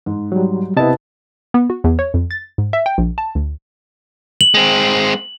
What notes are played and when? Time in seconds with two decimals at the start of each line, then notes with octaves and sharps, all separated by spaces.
0.06 G#2
0.32 F#3 G3
0.77 C3 B3 E4 D#5 A5
1.54 B3
1.70 F#4
1.84 E2
1.99 C#5
2.14 F2
2.31 A6
2.58 G#2
2.73 E5
2.86 G5
2.98 A#1
3.18 A5
3.35 D2
4.41 F#7
4.54 G#3 C4